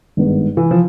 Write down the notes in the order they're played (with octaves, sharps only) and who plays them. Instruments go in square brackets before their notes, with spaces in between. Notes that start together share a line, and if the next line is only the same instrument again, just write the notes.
[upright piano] G#1 G2 D#3 G#3 B3
[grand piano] E3
F3